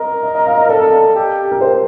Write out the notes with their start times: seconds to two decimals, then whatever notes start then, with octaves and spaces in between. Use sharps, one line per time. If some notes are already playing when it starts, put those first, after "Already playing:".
Already playing: A#4 D#5
0.23 D#5
0.34 D#5
0.46 F5
0.58 D#5
0.69 A4 D5
1.15 G4
1.51 A#4
1.61 C5